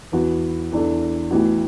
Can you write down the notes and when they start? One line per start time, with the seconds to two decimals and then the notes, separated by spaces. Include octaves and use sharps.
0.12 E2 E3 B3 F#4 B4
0.72 E2 E3 D4 A4
1.31 A1 A2 E3 B3 F#4